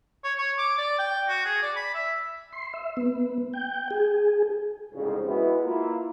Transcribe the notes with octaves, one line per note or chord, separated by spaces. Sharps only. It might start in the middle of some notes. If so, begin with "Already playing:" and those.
C#5
C#5
D6
D5
G5
F#4
G#4
D5
B5
E5
C6
E5
B3
G5
G#4
C2 F2 G#2 C#3
G#3 B3 E4 F#4
A#3 E4 F4